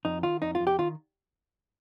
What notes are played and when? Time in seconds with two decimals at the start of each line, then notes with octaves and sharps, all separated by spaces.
0.05 F2 D#4
0.23 D#3 F4
0.42 F2 D#4
0.55 F4
0.60 F2
0.67 G4
0.79 D#3 F4